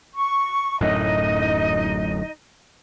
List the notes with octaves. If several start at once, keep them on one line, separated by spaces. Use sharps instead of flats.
C#6
D1 F#2 A2 D#4 D#5